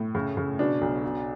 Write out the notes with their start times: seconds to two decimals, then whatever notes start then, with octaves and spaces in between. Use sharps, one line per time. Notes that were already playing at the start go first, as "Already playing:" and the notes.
Already playing: A2
0.15 C#3
0.37 C#3
0.59 B2 D4
0.81 B1
1.03 B2